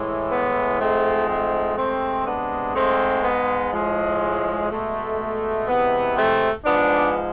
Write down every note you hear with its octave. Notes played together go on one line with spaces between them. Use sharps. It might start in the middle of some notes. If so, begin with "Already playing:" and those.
Already playing: A2 E3 G#3
B3
G#2 F3 G#3 A3 C4
A3 C4
C3 G#3 A3 C4
B3 D4
G#2 G#3 A3 C4
B3
A2 F3 G#3
B2 G#3 A3
C3 E3 G#3 B3
A3 C4
G#2 F3 G#3 B3 D4